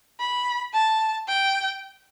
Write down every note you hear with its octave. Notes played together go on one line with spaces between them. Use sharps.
B5
A5
G5